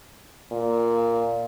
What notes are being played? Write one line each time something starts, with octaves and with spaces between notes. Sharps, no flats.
A#2